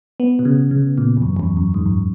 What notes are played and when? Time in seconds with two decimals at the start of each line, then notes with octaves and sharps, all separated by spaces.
0.20 B3
0.39 B2
0.45 C#3
0.71 C#3
0.98 A#2
1.17 E2
1.22 F#2
1.37 E2
1.39 F#2
1.57 F#2
1.74 G#2
1.86 F#2